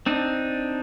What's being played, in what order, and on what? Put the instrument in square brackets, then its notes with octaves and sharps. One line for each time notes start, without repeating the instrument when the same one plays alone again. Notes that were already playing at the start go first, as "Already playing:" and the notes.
[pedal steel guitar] C4 D4 D#4